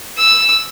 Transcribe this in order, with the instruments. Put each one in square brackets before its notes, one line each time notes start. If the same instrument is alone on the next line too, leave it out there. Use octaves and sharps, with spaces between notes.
[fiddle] E6